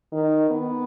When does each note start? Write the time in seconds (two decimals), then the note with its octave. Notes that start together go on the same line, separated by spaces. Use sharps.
0.12 D#3
0.50 B3